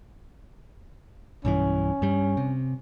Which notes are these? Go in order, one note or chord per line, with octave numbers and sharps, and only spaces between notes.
B1 G2 E3 C#4
G2 G3
C3